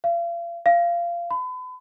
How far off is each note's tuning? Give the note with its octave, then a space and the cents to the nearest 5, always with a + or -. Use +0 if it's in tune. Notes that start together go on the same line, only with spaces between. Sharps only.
F5 -40
F5 -20
B5 +35